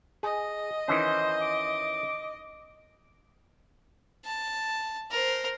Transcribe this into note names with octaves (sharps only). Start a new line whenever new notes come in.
G#4 D#5
D#3 E3 C#4 C5
D6
A5
A#4 C5